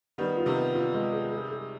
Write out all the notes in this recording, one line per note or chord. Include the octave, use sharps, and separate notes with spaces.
D#3 G3 B3
F4
C3 D#3
B3
F4
G#3
G#4
G#4
G#4